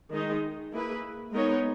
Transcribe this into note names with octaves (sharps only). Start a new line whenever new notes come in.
D#3 G#3 D#4
A#3 E4 G#4 B4
G#3 B3 D#4 A#4 C#5